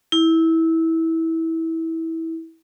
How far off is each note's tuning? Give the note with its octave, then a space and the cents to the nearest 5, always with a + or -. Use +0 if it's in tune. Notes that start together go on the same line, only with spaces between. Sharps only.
E4 -20